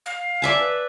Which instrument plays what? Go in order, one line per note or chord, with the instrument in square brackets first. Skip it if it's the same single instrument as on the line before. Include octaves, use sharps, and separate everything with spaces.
[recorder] F5
[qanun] D5 E5 A5 [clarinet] G#5
[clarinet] B4